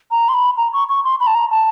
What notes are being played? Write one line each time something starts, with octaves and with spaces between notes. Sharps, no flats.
A#5
C6
B5
A#5
C#6
C#6
C6
B5
A5
A#5
A5